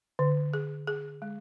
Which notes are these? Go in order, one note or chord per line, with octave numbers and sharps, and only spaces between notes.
D3
G#4
G#4
G#3